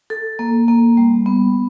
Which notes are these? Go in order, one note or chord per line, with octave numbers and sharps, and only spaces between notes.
A4
A#3
A#3
G3
B3